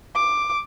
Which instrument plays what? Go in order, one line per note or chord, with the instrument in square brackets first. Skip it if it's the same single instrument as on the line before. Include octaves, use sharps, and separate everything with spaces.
[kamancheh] D6